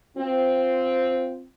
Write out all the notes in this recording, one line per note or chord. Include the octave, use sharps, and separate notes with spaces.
C4 F4